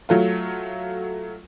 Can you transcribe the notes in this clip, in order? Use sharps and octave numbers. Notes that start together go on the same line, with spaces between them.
F#3 A3 F4